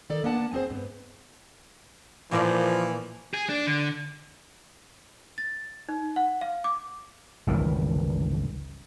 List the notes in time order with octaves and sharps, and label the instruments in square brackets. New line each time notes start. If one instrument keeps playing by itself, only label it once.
[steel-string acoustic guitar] D#3 A4 D5
A#3 B3 D4 F#5 A5
B3 C4 G#4 C5
G2 B3
[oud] A#2 A#3 D5 [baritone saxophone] E3 [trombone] F3
[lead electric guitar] G#4
D4
D3
[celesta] A6
D#4
F#5
F5
D6
[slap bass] G1 C#2 D#3 E3